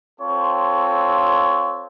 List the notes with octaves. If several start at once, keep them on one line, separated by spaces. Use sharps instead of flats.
C4 F4 A4 C5 C#5